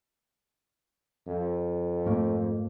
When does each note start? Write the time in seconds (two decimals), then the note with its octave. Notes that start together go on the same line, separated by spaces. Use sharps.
1.27 F2
2.06 G#2 A3 A#3